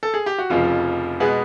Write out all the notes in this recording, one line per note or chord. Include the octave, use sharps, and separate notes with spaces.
A4
G#4
G4
F#4
F1 F2 C#3 F3 F4
B2 G#3 B3 G#4